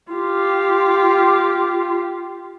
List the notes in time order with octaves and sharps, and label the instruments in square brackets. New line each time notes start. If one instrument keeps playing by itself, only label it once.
[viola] F4 G4